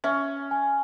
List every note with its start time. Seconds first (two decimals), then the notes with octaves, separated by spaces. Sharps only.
0.04 C#4 E5
0.51 G#5